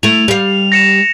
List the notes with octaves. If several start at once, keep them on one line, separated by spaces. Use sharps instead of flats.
A3 E4 F7
G3 F5
A#6 C#7 E7